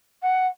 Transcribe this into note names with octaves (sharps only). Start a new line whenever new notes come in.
F#5